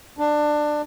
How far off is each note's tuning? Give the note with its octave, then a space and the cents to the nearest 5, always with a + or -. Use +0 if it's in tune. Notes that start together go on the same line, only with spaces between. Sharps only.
D4 +20